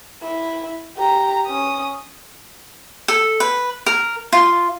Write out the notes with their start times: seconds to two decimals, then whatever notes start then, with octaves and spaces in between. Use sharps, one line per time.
0.22 E4
0.97 G4 A#5
1.46 C#4 D#6
3.08 A4
3.40 B4
3.86 A#4
4.33 F4